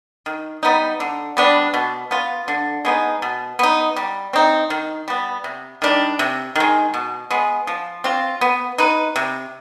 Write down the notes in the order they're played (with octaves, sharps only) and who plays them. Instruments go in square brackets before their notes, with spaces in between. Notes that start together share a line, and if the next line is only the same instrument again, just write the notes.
[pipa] D#3
G3 B3 D#4
D3
G3 B3 D4
B2
B3 F4
D3
G#3 B3 D#4
B2
B3 D#4
G3
C4 D#4
D#3
G3 B3
C3
D#3 G3 D4
C3
D#3 G#3
B2
G#3 B3
F3
C4 F4
B3
D#4 B4
C3